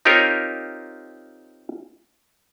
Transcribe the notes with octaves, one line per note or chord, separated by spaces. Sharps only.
C4 D#4 F4 G4 A#4 C#5